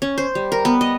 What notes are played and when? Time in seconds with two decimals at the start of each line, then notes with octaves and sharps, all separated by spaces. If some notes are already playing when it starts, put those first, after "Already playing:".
0.02 C#4
0.18 C5
0.35 G3
0.52 A#4
0.65 B3
0.81 D#5